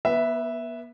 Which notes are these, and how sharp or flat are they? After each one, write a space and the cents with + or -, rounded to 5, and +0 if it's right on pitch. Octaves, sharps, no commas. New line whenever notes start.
B3 -40 B4 +0 E5 +0